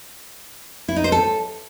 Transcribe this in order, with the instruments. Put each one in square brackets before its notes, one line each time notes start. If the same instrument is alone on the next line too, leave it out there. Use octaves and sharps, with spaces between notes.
[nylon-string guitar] E4
D#4
C5
A4